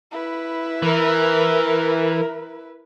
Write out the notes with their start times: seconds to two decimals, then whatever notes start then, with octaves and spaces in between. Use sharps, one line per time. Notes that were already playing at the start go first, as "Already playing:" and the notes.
0.11 E4 B4
0.83 E3 A#4